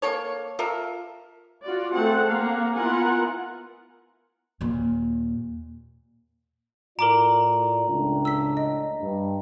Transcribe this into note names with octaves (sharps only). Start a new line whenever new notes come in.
A#3 A4 C#5
F4 A4 A#4 E5
F4 F#4 D5
A3 C4 G#4 F#5 A5
A#3 F5 F#5
B3 E4 F4 A#4 F#5 G#5
D#2 A#2
A2 F4 A#4 D5 A#5 D6 D7 F#7
C#2 A2 D4
E6 B6
D#5
G2